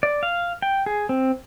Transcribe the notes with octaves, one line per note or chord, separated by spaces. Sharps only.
D5
F5
G5
G#4
C4